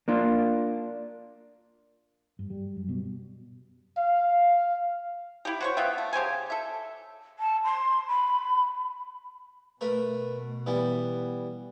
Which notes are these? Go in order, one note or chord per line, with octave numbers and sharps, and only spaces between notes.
A#3 D4 F4
G2
G3
F#2
B2
F5
E4 G4
F#4 C5 C#5
B3 F4 E5 G5
A3
C#3 G4 C5 G#5
A4 E5
A5
C6
B5
B2 A3 A#4 B4
E3 G3 B3